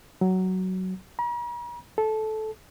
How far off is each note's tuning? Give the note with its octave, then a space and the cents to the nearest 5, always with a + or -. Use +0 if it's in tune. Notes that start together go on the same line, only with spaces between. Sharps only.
F#3 +10
A#5 +45
A4 -15